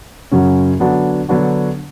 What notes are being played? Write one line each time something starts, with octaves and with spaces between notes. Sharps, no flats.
F#2 C#3 F#3 C#4
D3 F#3 B3 D4 F#4
D3 F#3 B3 D4 F#4